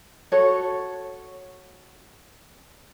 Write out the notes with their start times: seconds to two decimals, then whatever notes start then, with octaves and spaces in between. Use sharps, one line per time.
0.32 F#4 A4 C#5